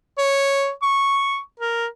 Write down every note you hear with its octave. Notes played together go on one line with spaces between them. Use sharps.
C#5
C#6
A#4